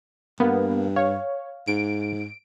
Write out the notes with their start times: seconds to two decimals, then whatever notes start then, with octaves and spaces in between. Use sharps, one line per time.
0.40 G2 A#3 B3
0.96 C#5 F5
1.68 G#2 D7